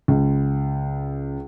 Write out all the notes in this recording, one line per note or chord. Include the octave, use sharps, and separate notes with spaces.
C#2